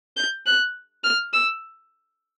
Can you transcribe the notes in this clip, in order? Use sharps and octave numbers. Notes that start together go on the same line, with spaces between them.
G6
F#6
F6
E6